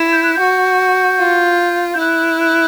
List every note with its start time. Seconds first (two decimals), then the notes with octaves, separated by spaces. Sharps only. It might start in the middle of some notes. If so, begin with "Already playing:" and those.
Already playing: E4
0.12 G6
0.23 F#6
0.35 F#4 G6
1.19 F4
1.94 G6
1.99 E4 F#6
2.40 F#6